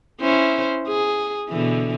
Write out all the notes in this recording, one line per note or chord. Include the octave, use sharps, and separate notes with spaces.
C#4 E4 C5
G#4
B2 D3 E3